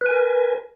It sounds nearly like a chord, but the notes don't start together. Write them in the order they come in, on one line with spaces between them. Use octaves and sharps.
B4 G#5 A#4